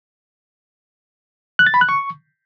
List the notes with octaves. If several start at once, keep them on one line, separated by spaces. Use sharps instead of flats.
F#6
A6
B5
F#6
C#6